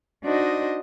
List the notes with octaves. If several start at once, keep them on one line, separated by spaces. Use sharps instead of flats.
D4 D#4 F#4 C5 D#5